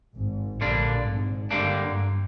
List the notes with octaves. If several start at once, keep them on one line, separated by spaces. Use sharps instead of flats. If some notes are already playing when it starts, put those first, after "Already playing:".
G#1 G#2
A#1 A#2 D3 G3 A#3 D4
G#1 G#2
G2 D3 G3 A#3 D4
G2